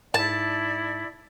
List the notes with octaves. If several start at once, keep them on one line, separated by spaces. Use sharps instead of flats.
G#2 E4 D5 A5